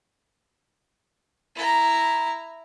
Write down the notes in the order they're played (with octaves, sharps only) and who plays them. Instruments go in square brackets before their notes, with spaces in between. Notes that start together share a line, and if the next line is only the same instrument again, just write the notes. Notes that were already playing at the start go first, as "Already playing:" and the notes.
[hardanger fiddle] E4 A#5